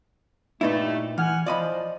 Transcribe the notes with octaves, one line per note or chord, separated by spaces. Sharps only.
G2 A#2 A3 D#4 E4
E3 F#5 G#5 F6
F3 D5 D#5 B5